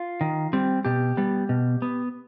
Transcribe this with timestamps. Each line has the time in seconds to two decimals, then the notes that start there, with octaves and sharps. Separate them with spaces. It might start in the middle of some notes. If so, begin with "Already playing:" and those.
Already playing: F4
0.21 D#3
0.53 G3 C4
0.85 B2 G4
1.17 G3 B3
1.49 B2
1.82 B3